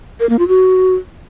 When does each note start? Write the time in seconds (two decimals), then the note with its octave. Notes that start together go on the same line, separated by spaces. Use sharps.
0.20 A#4
0.29 A#3
0.39 F4
0.48 F#4